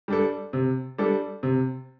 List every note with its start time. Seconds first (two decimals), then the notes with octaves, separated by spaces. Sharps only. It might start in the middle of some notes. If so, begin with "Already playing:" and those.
0.08 G3 D4 A4
0.53 C3
0.98 G3 D4 A4
1.43 C3